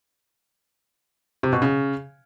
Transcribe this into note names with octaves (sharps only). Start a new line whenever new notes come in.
C3
B2
C#3